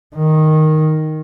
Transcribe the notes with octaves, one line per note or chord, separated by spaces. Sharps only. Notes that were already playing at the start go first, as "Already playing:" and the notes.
D#3